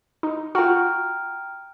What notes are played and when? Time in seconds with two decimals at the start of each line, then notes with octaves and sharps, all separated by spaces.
0.23 D#4
0.55 F4 F#4 G5 A#5 F6